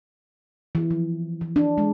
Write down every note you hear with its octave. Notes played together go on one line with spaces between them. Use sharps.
E3
F3
E3
D4
G#3